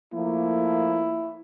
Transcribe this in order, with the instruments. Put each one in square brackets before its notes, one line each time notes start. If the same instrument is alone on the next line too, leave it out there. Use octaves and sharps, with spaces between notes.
[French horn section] F3 A3 A#3 [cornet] E4